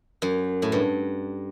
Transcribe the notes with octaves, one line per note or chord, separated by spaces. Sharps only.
F#2
A2
G2